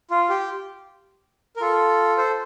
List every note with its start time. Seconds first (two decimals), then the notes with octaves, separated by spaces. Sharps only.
0.11 F4
0.29 G4
1.56 A#4
1.61 F4 A4
2.17 A4 C5